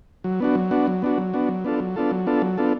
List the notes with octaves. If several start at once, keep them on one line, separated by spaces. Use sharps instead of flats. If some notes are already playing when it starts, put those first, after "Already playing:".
F#3
B3 D4 F#4
F#3
B3 D4 F#4
F#3
B3 D4 F#4
F#3
B3 D4 F#4
F#3
B3 D4 F4 A4
F#3
B3 D4 F4 A4
F#3
B3 D4 F4 A4
F#3
B3 D4 F4 A4